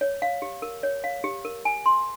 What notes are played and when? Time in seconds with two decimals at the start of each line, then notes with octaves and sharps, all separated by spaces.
0.01 C#5
0.22 F5
0.42 G4
0.62 A#4
0.83 C#5
1.04 F5
1.24 G4
1.45 A#4
1.65 G#5
1.86 C6